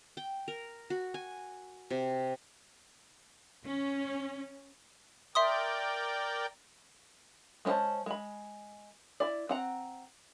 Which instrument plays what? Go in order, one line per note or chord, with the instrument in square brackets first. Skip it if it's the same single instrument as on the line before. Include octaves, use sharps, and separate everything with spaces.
[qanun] G5
A#4
F#4
G#5
C3
[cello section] C#4
[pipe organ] A#4 D5 G5 [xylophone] E5 C6 D#6
[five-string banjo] G#3 C4 C#4 C5 A5
G#3 B5
E4 D5
C4 F#5 A#5